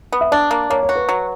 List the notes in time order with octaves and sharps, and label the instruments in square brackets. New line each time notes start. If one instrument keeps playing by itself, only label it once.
[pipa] B3
[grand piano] E5
[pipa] D4 [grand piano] D5
[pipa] A#3
[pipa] A#3 [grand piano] C#5
[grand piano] C#5
[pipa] F#4
[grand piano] B4
[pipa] F#3